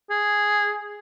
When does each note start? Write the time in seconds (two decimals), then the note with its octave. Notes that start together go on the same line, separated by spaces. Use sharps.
0.10 G#4